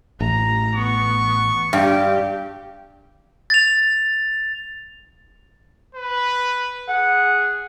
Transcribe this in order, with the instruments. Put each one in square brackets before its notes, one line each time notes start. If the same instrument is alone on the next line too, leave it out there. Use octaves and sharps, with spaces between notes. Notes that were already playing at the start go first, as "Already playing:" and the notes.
[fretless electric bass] A1 [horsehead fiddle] A#5
[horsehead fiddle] B3 [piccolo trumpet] C#6
[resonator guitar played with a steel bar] G2 [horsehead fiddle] G3 G4
[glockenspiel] A6 F7
[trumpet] B4
[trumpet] G#4 [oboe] F#5